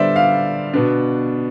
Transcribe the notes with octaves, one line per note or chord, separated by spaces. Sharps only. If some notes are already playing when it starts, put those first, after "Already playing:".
Already playing: D3 G3 B3 C5 D5 E5
F5
B2 B3 D4